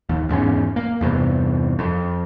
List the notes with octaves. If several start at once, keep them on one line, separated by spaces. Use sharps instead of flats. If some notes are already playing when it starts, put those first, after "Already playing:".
D#2
E2 G#2 A#3 C#4
A#3
E2 G2 C3
F2